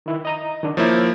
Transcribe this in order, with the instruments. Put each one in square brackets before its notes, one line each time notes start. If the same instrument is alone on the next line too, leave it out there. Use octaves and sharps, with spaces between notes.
[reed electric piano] D#3 E4
D#5 A#5 D#6
D#3 D4
[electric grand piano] F3 A#3 E4 [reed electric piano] C#5 E6 G6